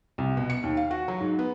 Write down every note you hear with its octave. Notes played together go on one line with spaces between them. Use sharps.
C2
B2
C#7
D#2
F5
F#4
F#3
G#2
B3